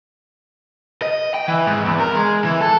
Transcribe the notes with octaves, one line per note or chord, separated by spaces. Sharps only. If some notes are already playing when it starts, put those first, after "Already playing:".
D#5
G5
E3
G#2
E2
A#4
G#3
E3
A4